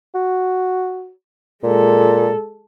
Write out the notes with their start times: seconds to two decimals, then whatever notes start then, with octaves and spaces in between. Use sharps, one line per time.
0.15 F#4
1.63 A#2 G#3 A4